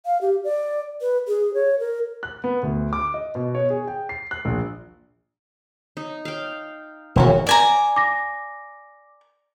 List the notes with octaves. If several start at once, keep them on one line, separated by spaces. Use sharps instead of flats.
F5
G4
D5
B4
G#4
C#5
A#4
F#6
B3
D2
D6
D#5
B2
C#5
G#4
G5
C7
F#6
A#1
D#4
F5 G5
E1 D#3 A#3 C#4 F#4
D5 G#5 A#5
D6 A#6